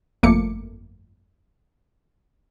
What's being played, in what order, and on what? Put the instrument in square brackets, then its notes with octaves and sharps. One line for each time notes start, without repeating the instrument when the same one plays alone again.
[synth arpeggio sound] G1 F2 A3 A#3 D6 C#7